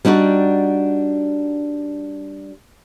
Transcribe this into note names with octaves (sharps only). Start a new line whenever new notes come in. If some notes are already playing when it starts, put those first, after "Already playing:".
G3 D4 D#4 F#4 D5